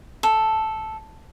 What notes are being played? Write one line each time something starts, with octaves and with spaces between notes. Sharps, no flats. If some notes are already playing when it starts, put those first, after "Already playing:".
A4